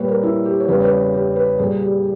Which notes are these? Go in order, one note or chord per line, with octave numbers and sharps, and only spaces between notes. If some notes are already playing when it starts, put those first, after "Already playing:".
Already playing: A#2 G3 B4 C#5
A#4
E4
G4
C#5
E2 C#3 G3 B4
B4
G4
B4
A#2 G3 G#4
G4